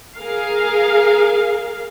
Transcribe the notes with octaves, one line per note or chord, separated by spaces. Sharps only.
G#4 A#4 F5